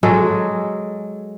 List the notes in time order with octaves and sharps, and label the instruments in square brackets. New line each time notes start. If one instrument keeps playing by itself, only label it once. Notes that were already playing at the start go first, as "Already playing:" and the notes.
[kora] F#3 G#3 G#4 A4